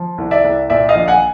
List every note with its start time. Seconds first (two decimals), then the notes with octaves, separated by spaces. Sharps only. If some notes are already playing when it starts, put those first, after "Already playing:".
Already playing: F3
0.18 C2
0.31 D5 E5
0.44 C2
0.69 A#2 D5 E5
0.89 D#5 F5
0.95 A#1
1.08 F#5 G#5